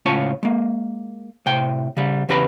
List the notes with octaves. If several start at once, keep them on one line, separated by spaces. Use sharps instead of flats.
C#2 A2 C#4 F4 C#5 A5
G#3 A#3
A2 C3 G5
C#3 G3
E2 C#3 G4 B4 A#5 B5